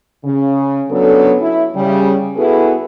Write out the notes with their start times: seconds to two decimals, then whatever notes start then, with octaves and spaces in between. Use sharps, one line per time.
0.25 C#3
0.89 F#3 B3 C#4 D4 A4
1.41 E4
1.74 C#3 G3
2.37 B3 E4 F#4 G#4 A4 B4